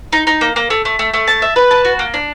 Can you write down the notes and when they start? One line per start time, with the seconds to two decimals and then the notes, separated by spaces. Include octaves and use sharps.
0.13 D#4
0.27 D#4
0.41 A#3
0.56 A#3
0.70 A3
0.85 A3
0.99 A3
1.14 A3
1.27 A5
1.42 E5
1.56 B4
1.71 A5
1.85 F#4
1.99 A#3
2.14 D4